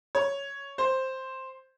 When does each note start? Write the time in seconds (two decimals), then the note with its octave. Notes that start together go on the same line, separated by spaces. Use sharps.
0.15 C#5
0.78 C5